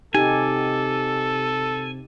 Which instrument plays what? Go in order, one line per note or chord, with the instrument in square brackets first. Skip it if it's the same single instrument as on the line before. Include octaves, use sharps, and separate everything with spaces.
[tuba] C3 [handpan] D#4 G4 [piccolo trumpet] A4 [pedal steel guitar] G#5